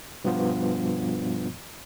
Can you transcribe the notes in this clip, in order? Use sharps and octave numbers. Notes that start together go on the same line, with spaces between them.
G2 B2 F3 B3 F4